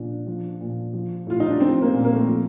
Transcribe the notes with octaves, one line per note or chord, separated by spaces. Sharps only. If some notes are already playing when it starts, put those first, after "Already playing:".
Already playing: A#2 F3 D4
F3
A#2
F3
A2 F4
D#4
D4
F3 C4
A#3
A#2
A#3
A3
F3